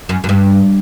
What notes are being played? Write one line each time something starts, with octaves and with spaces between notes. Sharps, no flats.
F#2
F#2
G2